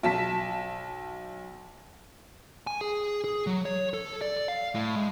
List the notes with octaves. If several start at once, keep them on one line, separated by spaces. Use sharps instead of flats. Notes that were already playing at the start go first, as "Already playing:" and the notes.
B1 A5 B6
G#5
G#4
G#4
F#3
C#5
A4
D5
D5
F5
A2
G#3